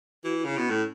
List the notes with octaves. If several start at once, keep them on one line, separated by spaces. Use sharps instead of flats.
E3 F#4
F#4
C#3 E4
B2
A2 C#4